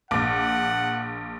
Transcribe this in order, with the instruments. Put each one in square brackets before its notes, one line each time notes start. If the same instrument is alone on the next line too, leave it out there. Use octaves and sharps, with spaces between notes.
[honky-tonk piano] A#1 D6 [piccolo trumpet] F#5